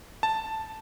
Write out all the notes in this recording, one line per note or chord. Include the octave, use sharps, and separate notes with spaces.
A5